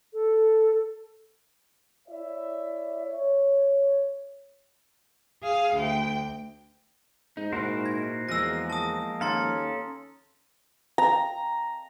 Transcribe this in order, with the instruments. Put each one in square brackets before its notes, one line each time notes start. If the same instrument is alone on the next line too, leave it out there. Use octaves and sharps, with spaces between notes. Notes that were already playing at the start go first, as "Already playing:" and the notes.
[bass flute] A4
[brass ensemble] E4 C#5 D5 E5
C#5
[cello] G#4 F5
D2 G5
[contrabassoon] G#2 [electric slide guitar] D#4
[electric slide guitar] A#2 D#4 E4 [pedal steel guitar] F#4 A#4 C5
[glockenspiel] G#6
[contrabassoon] E2 [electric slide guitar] F3 G#3 A#3 [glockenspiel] E6 A#6
[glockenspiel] A5 D#6
[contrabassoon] D#2 [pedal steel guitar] C#4 A4 F5 [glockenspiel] A#5 C6 A6
[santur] A#5